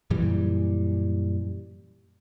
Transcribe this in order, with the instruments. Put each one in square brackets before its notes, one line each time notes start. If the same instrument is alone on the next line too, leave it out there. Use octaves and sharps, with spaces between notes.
[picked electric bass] F#2 A#2 E3 G3